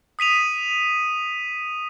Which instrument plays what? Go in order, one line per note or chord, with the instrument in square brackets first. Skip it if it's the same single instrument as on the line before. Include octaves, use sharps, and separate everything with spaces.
[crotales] D#6 B6 D#7 F7